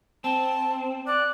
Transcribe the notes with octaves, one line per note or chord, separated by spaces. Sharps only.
C4 A5
D5 F#6